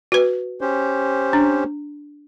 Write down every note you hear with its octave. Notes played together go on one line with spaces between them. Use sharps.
F#4 B4
C#4 G4 C5
D4